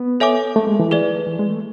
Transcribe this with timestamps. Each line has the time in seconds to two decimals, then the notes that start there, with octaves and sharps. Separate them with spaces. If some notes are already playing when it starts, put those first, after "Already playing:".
Already playing: B3
0.20 A4 C#5 E5 G#5 D6
0.56 A3
0.67 G#3
0.80 E3
0.91 G#4 B4 D5
1.27 E3
1.39 G#3
1.50 A3